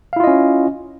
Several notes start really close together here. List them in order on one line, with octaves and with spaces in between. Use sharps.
F5 E4 F4 D#5 C#4